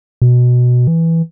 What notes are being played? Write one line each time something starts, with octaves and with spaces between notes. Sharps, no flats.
B2
E3